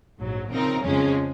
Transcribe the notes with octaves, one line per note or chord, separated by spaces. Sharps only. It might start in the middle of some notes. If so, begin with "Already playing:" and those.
A#1 G#2 F#3
C#3 F3 C4 D#4 A#4
F2 C#3 F3 G#3 C#4